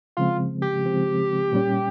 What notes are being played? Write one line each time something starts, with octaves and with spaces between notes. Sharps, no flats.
C#3 F3 G#3 C4 F4
G4
C#3 F3 G#3 C4
A#2 G3 C#4